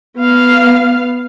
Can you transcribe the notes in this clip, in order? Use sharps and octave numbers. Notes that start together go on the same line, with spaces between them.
B3 F5